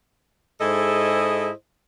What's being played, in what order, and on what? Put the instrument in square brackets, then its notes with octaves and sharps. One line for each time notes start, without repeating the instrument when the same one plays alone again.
[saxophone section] G#2 E4 G#4 A4 C5 D#5